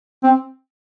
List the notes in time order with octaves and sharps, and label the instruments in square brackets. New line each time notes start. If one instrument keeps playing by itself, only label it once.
[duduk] C4